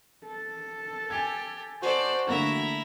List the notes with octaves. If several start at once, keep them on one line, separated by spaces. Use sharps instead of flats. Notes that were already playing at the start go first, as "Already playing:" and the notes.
A4
G4 G#5 G#6
F#4 A4 C5 D5
D3 A3 A#3 E4 E5 A#5